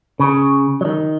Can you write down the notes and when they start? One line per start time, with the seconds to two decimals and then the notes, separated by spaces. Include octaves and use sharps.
0.19 C#3
0.81 F#3
0.85 D#3